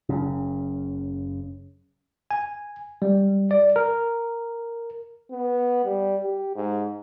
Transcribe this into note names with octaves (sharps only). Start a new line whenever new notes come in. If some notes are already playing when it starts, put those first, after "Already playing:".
F#1 F#2 C#3
G#5
G3
D5
A#4
B3
G3
G4
G#2